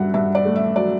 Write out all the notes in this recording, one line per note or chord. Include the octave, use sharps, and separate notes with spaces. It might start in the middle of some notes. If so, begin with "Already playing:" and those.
Already playing: G2 F#3 E5 F#5
G2 E5
D5
A3
E5
F#3 D5